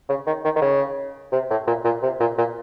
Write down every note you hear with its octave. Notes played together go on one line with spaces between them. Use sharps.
C#3
D#3
D#3
D#3
C#3
C3
A2
A#2
A#2
C3
A#2
A#2